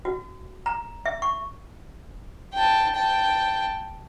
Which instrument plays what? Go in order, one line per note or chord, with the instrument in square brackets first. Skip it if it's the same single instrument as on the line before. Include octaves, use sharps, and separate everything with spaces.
[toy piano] F#4
A#5
E5
C#6
[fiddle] G5 A5
G5 A5